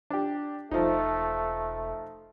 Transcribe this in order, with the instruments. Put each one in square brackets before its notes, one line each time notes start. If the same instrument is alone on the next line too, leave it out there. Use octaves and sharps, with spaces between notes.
[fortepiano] D4 G4
[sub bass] E1 [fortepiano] F3 D#4 [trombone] A3